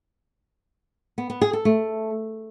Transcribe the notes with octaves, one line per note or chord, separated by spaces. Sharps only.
B3
B3
G#4
A4
A3